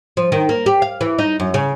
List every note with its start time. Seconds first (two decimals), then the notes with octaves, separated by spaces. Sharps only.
0.17 F3
0.32 D#3
0.49 A#3
0.66 G4
0.82 F5
1.01 E3
1.19 D#4
1.40 F#2
1.54 C#3